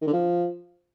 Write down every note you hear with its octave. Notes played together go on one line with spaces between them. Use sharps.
D#3
D3
F3